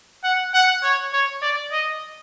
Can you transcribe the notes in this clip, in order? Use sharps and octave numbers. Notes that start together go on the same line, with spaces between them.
F#5
F#5
C#5
C#5
D5
D#5